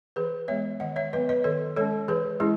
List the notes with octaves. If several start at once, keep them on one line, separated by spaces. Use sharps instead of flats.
E3 G#4 B4
G#3 B3 C#5 E5
D#3 D#5 F#5
C#5 E5
F#3 B3 B4 D#5
B4 D#5
D#3 A4 C#5
G#3 C#4 A4 C#5
E3 G#4 B4
G#3 C#4 E4 G#4